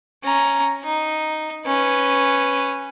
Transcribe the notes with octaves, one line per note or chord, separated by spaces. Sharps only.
C#4 A#5
D#4
C#4 B4